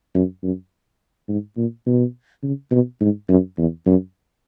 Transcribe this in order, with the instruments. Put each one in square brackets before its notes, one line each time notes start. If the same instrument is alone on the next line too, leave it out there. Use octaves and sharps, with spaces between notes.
[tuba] F#2
F#2
G#2
A#2
B2
C#3
B2
G#2
F#2
E2
F#2